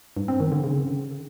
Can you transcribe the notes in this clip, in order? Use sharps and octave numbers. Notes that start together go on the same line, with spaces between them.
G2
C4
D#3
D3
C#3